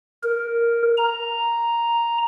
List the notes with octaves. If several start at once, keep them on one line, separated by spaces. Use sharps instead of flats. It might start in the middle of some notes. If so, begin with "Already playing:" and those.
A#4
A#5